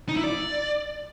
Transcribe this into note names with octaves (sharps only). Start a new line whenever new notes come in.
D#4
E4
D5